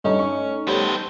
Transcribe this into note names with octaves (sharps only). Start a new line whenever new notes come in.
G2 A3 C#4 D#4
C#6
G3 B3 A4 C5 C#5